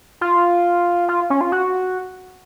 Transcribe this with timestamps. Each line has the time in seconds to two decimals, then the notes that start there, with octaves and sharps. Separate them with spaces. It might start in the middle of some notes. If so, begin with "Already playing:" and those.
0.21 F4
1.09 F4
1.30 C#4
1.41 F4
1.52 F#4